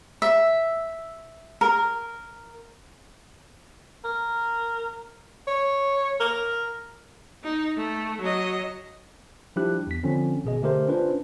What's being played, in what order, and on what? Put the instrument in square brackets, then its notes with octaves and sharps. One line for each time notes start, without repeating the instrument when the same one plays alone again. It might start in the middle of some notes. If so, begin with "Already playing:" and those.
[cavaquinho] E5
A#4
[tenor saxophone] A#4
C#5
A#4
[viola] D#4
A3
F#3 D#5
[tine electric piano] F3 G3 D4 E4 G4 F#6
E2 B6
D3 F3 C4 C#4
G#1 B2 G#4 D#5
D3 A3 G4 A#4 C5
C#4 D4 F4 B4 C5